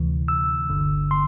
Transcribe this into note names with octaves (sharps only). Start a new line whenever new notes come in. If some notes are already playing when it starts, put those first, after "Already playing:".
Already playing: D2 C3 E3
E6
G1 G2 D3
C6